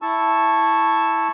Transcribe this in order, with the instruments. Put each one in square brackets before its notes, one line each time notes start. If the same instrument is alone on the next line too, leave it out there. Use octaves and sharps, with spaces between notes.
[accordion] E4 A5 C#6 E6